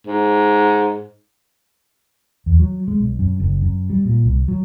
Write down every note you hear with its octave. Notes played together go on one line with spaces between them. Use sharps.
G#2
E2
F#3
G#3
B1
F#2
F#1
F#2
G3
A#2
C2
F#3